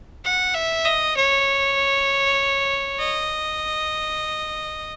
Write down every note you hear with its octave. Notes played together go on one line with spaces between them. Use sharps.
F#5
E5
D#5
C#5
D#5